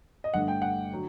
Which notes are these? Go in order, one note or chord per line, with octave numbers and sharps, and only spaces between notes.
D#5
G1 G2 D3 A3 F#5
G5
F#5
D3 F#3